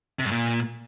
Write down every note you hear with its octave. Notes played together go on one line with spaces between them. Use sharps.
C3
G2
A#2